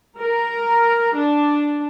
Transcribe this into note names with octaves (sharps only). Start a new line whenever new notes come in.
A#4
D4